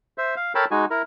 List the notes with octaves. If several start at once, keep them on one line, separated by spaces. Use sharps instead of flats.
C5 E5
F5
A4 A#4 C#5 G5 A5 B5
G#3 D#4 F#4 G#5
E4 A#4